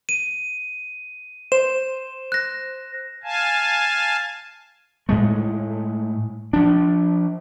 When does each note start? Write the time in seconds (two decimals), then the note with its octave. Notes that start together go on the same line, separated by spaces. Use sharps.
0.09 D#7
1.52 C5 E7
2.32 F#6 A#6
3.23 F5 G#5 A5
5.09 A2 G#3 A3
6.53 F3 D4